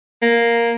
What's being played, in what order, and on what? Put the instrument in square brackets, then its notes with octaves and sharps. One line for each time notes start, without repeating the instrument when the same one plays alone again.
[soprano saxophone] A#3